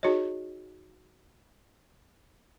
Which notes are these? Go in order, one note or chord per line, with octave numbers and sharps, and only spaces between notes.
D#4 F#4 G#4 C#5 D#5